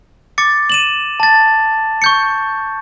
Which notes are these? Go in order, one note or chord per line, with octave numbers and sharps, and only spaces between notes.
D6 A6 C#7
D#7 E7 F#7
A5 A6
C#6 G6 C#7